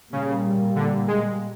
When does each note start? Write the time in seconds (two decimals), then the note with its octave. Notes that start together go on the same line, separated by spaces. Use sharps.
0.12 A#2 C#3 G3 A#3
0.76 D3
1.08 G#3